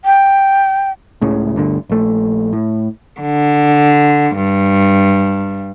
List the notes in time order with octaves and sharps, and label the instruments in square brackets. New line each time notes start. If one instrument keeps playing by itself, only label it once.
[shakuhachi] G5
[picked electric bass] C#2 A2 C#3
D2 G2 D3
A#1 A3
A2
[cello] D3
G2